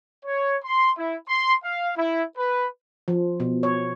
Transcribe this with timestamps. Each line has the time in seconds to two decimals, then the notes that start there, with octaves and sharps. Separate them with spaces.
0.25 C#5
0.63 C6
0.97 E4
1.27 C6
1.63 F5
1.96 E4
2.36 B4
3.08 F3
3.40 B2
3.63 C#5